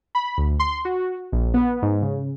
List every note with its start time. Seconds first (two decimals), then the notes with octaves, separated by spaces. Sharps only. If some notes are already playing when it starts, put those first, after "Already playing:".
0.15 B5
0.37 D2
0.60 C6
0.85 F#4
1.32 A#1
1.54 B3
1.82 G#2
2.02 C#3